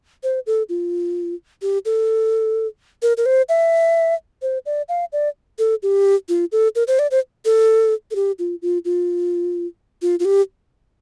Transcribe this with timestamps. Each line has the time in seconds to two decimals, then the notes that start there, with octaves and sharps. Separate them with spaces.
0.23 C5
0.47 A4
0.69 F4
1.62 G4
1.85 A4
3.02 A#4
3.17 A#4
3.26 C5
3.49 E5
4.42 C5
4.66 D5
4.89 F5
5.12 D5
5.59 A4
5.83 G4
6.29 F4
6.52 A4
6.75 A#4
6.88 C5
6.99 D5
7.11 C5
7.45 A4
8.11 A4
8.15 G4
8.39 F4
8.62 F4
8.85 F4
10.02 F4
10.20 F4
10.25 G4